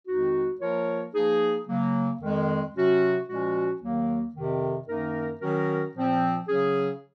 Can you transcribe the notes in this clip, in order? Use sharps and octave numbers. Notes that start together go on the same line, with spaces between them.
F2 D#3 G#3 D#4 F#4
F3 A#3 F4 A#4 C#5
F3 A#3 D#4 G#4
C#3 F#3 A#3
F2 D#3 G#3
C3 F#3 C#4 F#4
A#2 F3 G#3 C#4 F#4
D#2 D#3 F#3 A#3
F2 C3 D#3
F#2 D#3 A#3 D#4 A#4
D#3 F#3 C#4 F#4 A#4
A#2 F3 C4
C#3 F#3 C#4 G#4